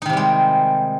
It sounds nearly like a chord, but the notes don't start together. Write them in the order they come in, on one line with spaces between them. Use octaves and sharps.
D#4 D#3 C3 G3 G#3